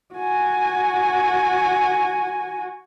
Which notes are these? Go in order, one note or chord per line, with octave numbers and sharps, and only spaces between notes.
F#4 G#5